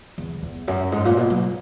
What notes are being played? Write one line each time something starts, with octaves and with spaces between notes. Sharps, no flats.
E2
E2
F#2
G#2
A#2
B2
F#3